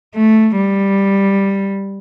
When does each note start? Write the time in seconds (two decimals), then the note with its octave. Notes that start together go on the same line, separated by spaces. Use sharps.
0.15 A3
0.56 G3